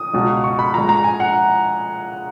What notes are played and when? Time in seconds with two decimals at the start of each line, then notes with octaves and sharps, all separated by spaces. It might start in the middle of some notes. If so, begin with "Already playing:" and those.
Already playing: D#6
0.13 C#2 B2 G#3
0.44 C#6
0.59 B5
0.74 A#2 G#3 A#5
0.89 A#5
1.04 G#5
1.20 F#5